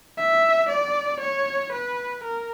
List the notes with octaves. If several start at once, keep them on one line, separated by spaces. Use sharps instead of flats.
E5
D5
C#5
B4
A#4